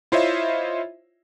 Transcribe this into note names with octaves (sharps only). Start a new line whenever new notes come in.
E4 F4 C5 C#5 D#5 E5